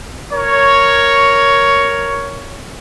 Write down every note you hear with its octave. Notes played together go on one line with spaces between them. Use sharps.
A#4 C#5